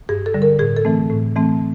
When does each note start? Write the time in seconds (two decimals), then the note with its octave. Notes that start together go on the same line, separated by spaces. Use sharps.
0.09 G2 G#4
0.26 A4
0.34 D3 G3
0.42 A#4
0.59 A2 G#4
0.77 A4
0.85 E3 A3 C4
1.10 A2
1.36 E3 A3 C4